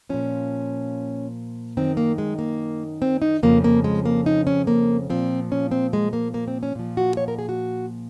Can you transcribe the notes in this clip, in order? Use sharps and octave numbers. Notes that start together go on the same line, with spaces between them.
A#2 F3 C#4
F#2 D#3 C4
A#3
G#3
A#3
C4
D#4
F2 C#3 F3 A#3
A#3
G#3
A#3
D#4
C#4
A#3
A#2 F3 C4
C#4
C4
G#3
A#3
A#3
C4
C#4
A#2 F3
F#4
C#5
A#4
G#4
F#4